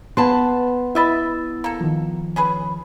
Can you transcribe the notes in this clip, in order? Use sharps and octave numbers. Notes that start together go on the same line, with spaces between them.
A#3 B3 G#4 B4 A5 C6
E4 B4 D#5 E5 E6 A6
A#3 A4
D#3 F3
C#4 G#4 B4